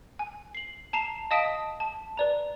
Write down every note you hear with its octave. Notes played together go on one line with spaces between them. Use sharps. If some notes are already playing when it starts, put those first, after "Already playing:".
G#5
C7 F#7
A5 A#5 C7 E7
D#5 F5 A5 D#6 B6 D7
A5
B4 D5 A#5